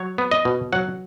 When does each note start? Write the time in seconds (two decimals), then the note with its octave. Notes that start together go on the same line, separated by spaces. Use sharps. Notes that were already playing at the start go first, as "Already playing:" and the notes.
Already playing: F#3 C#5
0.18 B3
0.31 D#5
0.45 B2
0.73 F#3 F#5